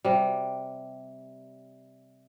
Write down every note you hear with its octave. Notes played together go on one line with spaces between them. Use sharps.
C3 G3